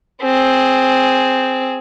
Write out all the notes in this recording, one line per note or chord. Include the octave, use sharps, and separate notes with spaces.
C4 G#4